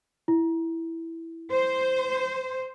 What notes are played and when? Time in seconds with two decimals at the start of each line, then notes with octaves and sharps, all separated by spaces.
0.28 E4
1.52 C5